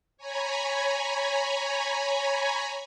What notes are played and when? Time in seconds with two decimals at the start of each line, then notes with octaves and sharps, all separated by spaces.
0.17 C#5 G#5 A#5 B5